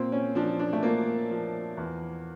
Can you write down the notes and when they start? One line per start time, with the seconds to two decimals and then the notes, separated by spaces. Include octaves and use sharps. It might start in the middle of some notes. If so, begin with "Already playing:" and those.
Already playing: A#2 C4
0.12 C#4
0.35 F3 D4
0.59 D4
0.73 A3
0.83 F3 A#3
1.31 F3
1.77 E2